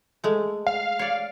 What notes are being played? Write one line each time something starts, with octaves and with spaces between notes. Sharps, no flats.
G#3 A3
F5
C#5 D5